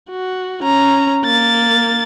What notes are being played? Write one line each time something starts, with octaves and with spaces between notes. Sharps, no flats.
F#4
C#4 A#5
A#3 A6